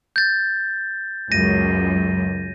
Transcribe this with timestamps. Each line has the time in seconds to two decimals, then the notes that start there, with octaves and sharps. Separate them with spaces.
0.16 G6 A6
1.32 C#2 F#2 A#6 D#7